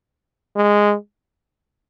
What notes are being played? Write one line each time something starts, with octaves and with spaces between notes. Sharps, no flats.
G#3